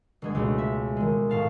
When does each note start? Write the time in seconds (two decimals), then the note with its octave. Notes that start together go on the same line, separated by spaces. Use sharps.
0.22 G1 G#3 G#6
0.35 C#2 B2 A3
0.58 E5
0.97 D#3 G#3
1.29 A2 F5 A5